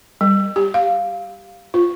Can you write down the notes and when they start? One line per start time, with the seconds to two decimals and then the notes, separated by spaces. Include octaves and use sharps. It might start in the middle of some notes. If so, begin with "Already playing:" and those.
0.21 G3
0.56 G4
0.74 F5
1.74 F4